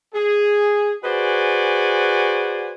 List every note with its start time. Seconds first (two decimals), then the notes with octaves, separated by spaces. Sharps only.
0.14 G#4
1.04 F#4 G#4 B4 C5 D5 G#5